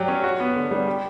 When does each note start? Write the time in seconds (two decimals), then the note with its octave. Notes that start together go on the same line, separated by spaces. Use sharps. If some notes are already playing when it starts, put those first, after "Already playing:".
Already playing: F#3 G4 D5
0.08 C#4
0.24 F#4
0.40 B3
0.56 D3
0.71 G3
0.86 G4